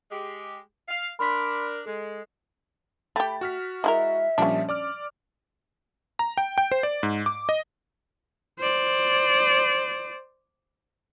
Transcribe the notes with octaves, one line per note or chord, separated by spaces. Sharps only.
G#3 G4
F5
D4 A#4 B5 C6 B6
G#3 A4 D#6
A3 G4 G5 B5 A6
F#4 F6 B6
G#3 E4 A#4 E5
A#2 F3 G3 C#4 D4
D5 D6 F6
A#5
G5
G5
C5
D5
G#2
D6
D#5
C5 D5